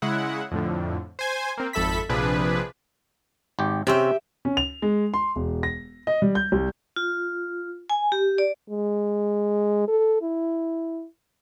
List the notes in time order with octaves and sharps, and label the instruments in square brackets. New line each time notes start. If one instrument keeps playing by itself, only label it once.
[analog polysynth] C#3 G#3 E4 F#5
F2 A2 D3
C5 G#5
A#3 C4
G#1 F2 A4 E5 B5 B6
A#1 C3 F3 D4 G#4 B4
[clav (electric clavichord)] G#1 G4
[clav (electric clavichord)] C3 C4 C#4 [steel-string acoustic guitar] G4 E5
[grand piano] C#4
F7
G#3
C6
E1
A#6
D#5
G3
G6
C2
[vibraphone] F4
G#5
G4
D5
[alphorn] G#3
A4
E4